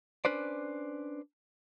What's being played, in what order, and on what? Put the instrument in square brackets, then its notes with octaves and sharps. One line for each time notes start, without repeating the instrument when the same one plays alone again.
[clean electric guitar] C#4 D4 B4 C5 D5